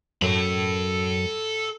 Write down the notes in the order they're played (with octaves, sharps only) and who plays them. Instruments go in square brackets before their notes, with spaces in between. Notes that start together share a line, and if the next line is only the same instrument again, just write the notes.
[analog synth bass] F#2 [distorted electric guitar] A4 B5